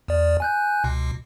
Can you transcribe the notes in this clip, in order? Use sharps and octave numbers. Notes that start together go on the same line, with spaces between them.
E2 D5
G#5 F#6 G6
C#2 B2